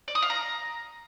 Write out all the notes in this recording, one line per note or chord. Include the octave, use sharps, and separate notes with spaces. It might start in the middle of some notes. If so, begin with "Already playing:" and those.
D5
D#6
F5
A#5